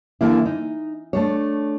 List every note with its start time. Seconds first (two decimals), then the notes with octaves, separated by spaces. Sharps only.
0.21 D3 E3 A#3 E4
0.46 D#4
1.13 A3 D4 C#5